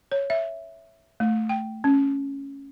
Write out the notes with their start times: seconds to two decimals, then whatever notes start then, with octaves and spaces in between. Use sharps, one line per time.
0.12 C#5
0.30 E5
1.20 A3
1.49 G5
1.84 C#4